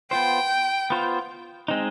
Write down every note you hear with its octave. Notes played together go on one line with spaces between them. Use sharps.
B3 F4 C5 G5
B3 F4 C5
G#3 C4 D#4